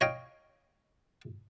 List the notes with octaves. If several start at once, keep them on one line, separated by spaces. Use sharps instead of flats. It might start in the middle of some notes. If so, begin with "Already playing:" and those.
C#5 D#5 F5 G5